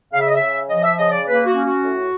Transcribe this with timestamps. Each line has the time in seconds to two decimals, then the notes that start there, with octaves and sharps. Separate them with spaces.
0.12 C#3 F5
0.20 E5
0.28 D#5
0.34 E5
0.40 C#3
0.69 F3 D#5
0.83 E5
0.98 C#3 D#5
1.11 D5
1.26 A#3 B4
1.46 F#4
1.54 C#4
1.64 F#4
1.83 A2